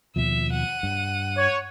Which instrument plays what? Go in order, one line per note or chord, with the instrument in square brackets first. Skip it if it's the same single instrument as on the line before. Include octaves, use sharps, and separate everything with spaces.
[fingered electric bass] D#2 B2 F3 [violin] E5
[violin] F#5 D#7
[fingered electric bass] G2
[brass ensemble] C#5